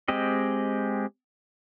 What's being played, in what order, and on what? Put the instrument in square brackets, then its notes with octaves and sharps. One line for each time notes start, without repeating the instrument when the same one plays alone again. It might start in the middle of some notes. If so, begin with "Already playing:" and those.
[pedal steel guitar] G#3 C4 G4 D#5